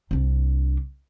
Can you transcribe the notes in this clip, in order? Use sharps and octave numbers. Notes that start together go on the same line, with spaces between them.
C2 D4